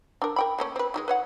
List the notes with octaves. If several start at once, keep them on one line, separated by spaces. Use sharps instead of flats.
D4 A#4
A#4 G5 B5
A3 A#3 C#4
C4 B4
D#3 G3 G#3
B4 C#5 F#5